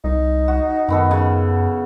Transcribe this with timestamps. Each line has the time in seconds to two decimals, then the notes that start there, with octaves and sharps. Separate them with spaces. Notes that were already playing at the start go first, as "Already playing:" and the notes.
0.04 C2 D#4
0.48 F#4
0.89 F#2 D#3 B3 A4
1.11 C#3